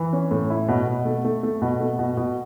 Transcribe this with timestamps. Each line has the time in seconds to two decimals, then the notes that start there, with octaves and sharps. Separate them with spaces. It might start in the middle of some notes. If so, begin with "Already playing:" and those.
Already playing: E3
0.13 C#4
0.31 A2
0.50 E4
0.68 B2
0.87 B2
1.05 A3
1.25 A3
1.43 A3
1.62 B2
1.80 A3
1.99 B2
2.17 B2